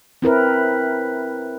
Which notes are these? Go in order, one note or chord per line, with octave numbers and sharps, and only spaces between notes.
C4 E4 A#4 B4